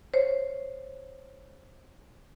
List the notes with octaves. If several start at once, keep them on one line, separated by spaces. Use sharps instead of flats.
C5 C#5